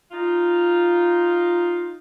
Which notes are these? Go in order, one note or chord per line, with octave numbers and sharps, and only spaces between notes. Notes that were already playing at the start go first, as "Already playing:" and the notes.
D#4 F4